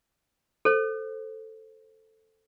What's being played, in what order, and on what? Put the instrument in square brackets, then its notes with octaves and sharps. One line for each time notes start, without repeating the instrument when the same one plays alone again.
[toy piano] A4 C5